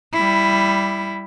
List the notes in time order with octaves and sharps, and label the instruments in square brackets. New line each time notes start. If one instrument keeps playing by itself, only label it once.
[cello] G3 E4